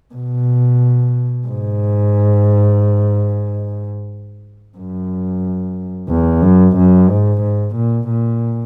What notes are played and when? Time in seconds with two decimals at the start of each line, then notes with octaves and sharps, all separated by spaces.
0.14 B2
1.47 G#2
4.77 F#2
6.09 E2
6.42 F#2
6.76 F#2
7.09 G#2
7.42 G#2
7.75 A#2
8.08 A#2